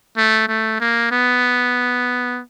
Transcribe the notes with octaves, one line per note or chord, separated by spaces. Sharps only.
A3
A3
A#3
B3